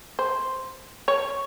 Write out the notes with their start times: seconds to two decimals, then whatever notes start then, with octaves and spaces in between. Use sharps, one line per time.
0.19 C5
1.08 C#5